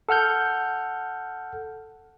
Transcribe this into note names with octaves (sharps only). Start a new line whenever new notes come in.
A4 F#5 F6 G6